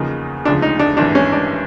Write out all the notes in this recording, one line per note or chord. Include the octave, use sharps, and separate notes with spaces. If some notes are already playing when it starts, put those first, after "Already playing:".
Already playing: E2 C#3 F3 A#3 D#4
E1 D2 C#3 F3 D4
D#4
D4
G#1 G2 E3 D4
C#4
D4